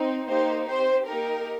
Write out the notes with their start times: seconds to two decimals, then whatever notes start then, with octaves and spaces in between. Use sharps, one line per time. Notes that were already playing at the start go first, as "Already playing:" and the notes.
Already playing: C4 D#4
0.29 A#3 D#4 G4 C5
0.68 C4 G4 C5
1.08 A#3 D#4 G4 A#4